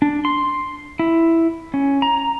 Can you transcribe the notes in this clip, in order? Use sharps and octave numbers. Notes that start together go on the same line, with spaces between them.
D4
C6
E4
C#4
A#5